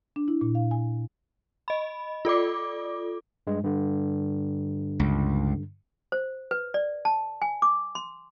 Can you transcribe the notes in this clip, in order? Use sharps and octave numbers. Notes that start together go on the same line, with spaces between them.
D4
E4
A#2
F5
G#5
D#5 B5
F4 A4 D5 D6
G2 G#3
G2 D3
C#2
C5
B4
D5
A5
G#5
D6
C6